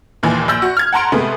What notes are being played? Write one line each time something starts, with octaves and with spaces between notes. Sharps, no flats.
D#2 A#2 D#3 E3
A#1 E6 G6
F#4
F6 G#6
F#5 A5 A#5 C6 D7
C3 G#3 A3 B3